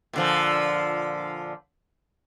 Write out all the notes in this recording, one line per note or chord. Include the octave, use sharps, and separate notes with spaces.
A#2 D3 F3